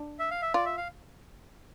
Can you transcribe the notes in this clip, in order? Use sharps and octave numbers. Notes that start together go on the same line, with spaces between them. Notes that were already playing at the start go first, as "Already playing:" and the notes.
Already playing: D4
E5
F5
E5
F4 D5
E5
F5